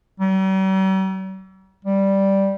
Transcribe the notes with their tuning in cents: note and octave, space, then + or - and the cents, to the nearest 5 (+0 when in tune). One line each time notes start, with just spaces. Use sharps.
G3 -45
G3 -5